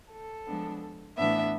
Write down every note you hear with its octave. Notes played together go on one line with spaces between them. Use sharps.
A4
F3 G#3 B3 D4
A2 E3 B3 D4 E5